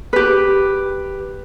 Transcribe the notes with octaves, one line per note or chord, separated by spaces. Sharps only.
G4 B4